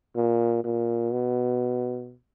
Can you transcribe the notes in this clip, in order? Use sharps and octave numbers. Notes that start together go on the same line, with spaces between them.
A#2
A#2
B2